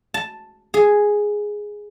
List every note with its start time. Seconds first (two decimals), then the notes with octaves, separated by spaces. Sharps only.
0.14 A5
0.74 G#4